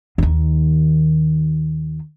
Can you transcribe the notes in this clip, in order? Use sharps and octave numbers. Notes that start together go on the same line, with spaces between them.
D#2 D#3